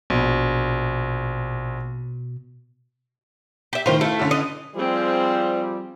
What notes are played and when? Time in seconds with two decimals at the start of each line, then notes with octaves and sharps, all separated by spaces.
0.10 A#1 B2
3.73 G4 E5
3.86 A2 D#3 F4 C5
4.01 A3 E4 F5
4.19 D3 C#4 E4
4.31 D#5
4.75 F3 G3 C4 G#4